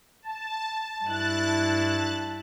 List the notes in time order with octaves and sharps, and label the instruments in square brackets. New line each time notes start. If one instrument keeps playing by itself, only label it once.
[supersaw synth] A5
[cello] G2 E4 [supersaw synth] A5 F#6 A6